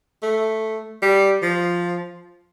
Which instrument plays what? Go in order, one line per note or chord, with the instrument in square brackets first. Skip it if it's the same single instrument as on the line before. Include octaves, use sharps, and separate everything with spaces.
[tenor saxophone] A3
G3
F3